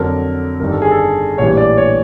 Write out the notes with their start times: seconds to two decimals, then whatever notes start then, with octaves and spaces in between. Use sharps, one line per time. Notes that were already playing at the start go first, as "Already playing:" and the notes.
Already playing: F2 D3 F#3 A#4
0.60 G1 G2 D#3 A#4
0.71 A4
0.82 G#4
0.91 A4
1.38 A#1 A2 E3 G3 C#5
1.57 D5
1.77 C#5